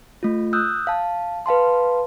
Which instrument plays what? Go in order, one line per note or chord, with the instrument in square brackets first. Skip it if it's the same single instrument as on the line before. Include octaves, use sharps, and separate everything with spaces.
[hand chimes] A3 F4
D#6 E6 F#6 G6
F5 A5
B4 F5 A5 C6